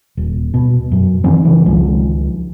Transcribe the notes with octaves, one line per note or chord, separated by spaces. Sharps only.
D#1
B2
F#2
D#3 E3 C4 C#4
C#3 E3
C#2 D#3 F3 G#3